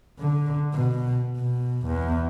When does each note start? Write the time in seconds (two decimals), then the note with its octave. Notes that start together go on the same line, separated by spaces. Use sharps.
0.19 D3
0.73 B2
1.36 B2
1.87 E2